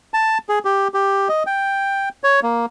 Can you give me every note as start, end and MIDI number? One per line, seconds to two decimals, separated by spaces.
0.14 0.38 81
0.49 0.59 68
0.65 0.88 67
0.94 1.28 67
1.29 1.43 75
1.47 2.09 79
2.24 2.40 73
2.43 2.66 58